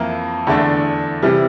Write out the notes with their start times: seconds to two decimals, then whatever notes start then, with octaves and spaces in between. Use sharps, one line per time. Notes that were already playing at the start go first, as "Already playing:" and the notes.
Already playing: F2 E3 A#3 E4
0.47 E2 D3 A3 D4
1.22 C3 E3 G3